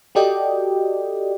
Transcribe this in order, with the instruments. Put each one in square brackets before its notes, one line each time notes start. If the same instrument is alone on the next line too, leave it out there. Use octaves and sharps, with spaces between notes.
[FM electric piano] F#4 G4 A4 D5 D#5 G5